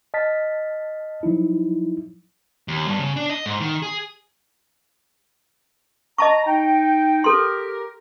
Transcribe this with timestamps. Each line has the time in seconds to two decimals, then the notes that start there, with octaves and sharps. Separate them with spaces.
0.14 D#5 A5 F6 A6 B6
1.23 F3 F#3 D#4 E4
2.68 D#2
2.88 G2
3.00 C#3
3.16 D4
3.30 D#5
3.46 G#2
3.60 D#3
3.82 G#4
6.18 D#5 A5 A#5 C#6
6.46 D#4 G5
7.24 G4 A4 A#4 C6